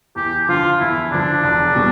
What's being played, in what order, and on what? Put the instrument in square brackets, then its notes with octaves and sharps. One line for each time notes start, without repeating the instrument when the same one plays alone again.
[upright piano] E2 [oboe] G4
[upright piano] D3 F3 [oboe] F4
[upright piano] E2 [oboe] E4
[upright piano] D3 F3 [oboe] D4
[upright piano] E1
B2 G3